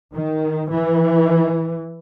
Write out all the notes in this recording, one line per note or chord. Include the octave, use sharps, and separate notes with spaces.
D#3
E3